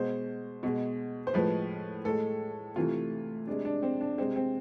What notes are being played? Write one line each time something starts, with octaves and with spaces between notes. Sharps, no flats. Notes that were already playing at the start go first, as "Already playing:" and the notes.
Already playing: B2 G#3 C5
B2 G#3
C5
A2 F3 G#3 B4
A2 G#3 A4
C3 E3 A3 F4
C3 G#3 D4
D4
C4
D4
C3 G#3 C4
C4